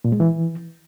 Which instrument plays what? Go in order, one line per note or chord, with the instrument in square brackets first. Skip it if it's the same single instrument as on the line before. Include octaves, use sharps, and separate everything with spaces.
[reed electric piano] A#2
G#3
E3